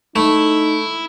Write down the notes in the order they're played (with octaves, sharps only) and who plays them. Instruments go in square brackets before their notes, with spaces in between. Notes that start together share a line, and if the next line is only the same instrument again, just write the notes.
[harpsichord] A3 [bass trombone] D#4 [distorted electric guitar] E4